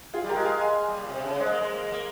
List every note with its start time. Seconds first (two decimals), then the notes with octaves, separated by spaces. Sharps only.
0.14 F4 G#4
0.24 G3
0.29 G#3 G4 A#4
0.45 F5 G#5
0.61 F5 G#5
0.88 G3
0.98 A#2
1.09 C3
1.24 C#3
1.40 G#3 C5 D#5
1.51 A#3
1.61 G#3
1.72 A#3
1.83 G#3
1.92 A#3